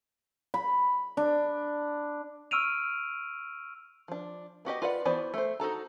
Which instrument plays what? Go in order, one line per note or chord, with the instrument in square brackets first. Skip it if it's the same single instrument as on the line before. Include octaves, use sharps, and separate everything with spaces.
[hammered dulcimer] B5
D4
[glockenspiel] C#6 E6 F6 D7 D#7 F7
[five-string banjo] F3 D4
B3 F#4 G4 D#5
F4 B4 D5 F#5
E3 B3 F#4 C5 D5
A3 C5
D#4 F#4 A4 A#5